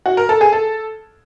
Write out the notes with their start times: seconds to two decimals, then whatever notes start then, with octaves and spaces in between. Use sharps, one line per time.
0.06 F#4
0.17 A#4
0.29 A4
0.41 G#4
0.53 A4